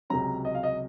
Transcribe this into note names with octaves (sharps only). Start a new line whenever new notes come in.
C#2 C3 F#3 C#4 A#5
D#5
F5
D#5